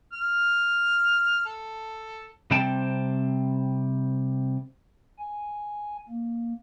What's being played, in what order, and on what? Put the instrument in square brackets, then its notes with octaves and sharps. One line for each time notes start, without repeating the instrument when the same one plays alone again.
[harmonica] F6
A4
[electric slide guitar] C3 G3 C4 C5 G5 A5
[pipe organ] G#5
A#3